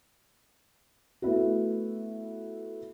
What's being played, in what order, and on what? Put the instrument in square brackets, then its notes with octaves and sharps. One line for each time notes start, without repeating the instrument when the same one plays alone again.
[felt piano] A3 B3 E4 F#4